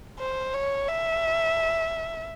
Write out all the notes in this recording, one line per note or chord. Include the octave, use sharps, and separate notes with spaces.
C5
C#5
E5